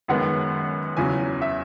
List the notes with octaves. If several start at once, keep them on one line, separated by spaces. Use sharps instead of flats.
F#2 D#3 G#3 B3 F#5
E2 C#3 F#3 G#5
E5